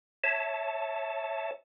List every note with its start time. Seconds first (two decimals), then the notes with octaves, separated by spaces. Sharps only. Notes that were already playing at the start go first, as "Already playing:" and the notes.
0.24 C#5 E5 A5